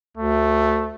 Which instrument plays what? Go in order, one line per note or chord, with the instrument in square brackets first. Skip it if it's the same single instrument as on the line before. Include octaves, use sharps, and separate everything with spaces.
[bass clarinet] D2 [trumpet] A3